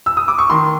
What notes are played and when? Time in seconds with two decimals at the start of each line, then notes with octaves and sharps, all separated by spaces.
0.06 E6
0.17 D#6
0.28 D6
0.38 C#6
0.50 D#3 C6